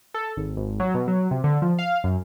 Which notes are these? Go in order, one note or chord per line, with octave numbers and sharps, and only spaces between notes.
A4
G#1
G#1
F#3
B2
F#3
C3
D3
F3
F5
F#2